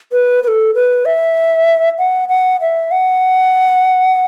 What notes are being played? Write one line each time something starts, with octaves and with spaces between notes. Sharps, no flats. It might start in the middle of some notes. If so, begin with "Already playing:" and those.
B4
B4
A4
B4
E5
F#5
F#5
E5
F#5